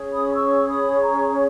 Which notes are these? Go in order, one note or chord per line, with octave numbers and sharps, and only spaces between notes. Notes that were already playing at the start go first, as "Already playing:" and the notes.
Already playing: C#4 G#4 C#5
B5 D#6
C#6 E6
B5 D#6
A#5 C#6